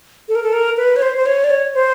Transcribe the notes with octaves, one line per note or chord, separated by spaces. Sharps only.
A4
A#4
A4
A#4
B4
C#5
C5
C5
C#5
D5
C#5
C5